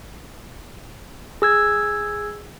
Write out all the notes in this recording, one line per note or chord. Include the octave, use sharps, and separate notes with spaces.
G#4 E6 G#6